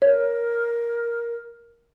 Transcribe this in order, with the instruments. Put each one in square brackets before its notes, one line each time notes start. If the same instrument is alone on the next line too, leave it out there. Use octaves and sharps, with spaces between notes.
[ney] A#4 [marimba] C#5